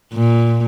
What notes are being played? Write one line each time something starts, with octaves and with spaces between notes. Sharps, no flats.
A#2